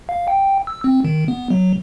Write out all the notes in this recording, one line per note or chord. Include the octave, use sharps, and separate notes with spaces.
F5
G5
E6
C4
D#3
B3
F#3